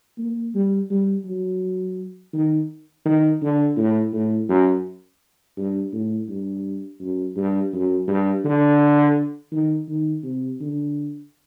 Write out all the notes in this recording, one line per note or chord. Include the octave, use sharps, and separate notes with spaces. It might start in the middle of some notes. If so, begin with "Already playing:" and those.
A#3
G3
G3
F#3
D#3
D#3
D3
A2
A2
F#2
G2
A2
G2
F#2
G2
F#2
G2
D3
D#3
D#3
C3
D3